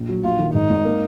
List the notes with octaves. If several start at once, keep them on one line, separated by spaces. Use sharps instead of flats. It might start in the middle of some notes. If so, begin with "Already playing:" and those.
Already playing: A#1
F#3
A#1 F4
D#3
G#2 D#4
G#1
A#3